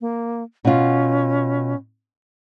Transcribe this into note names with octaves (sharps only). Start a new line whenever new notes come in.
A#3
B2 C#4 F4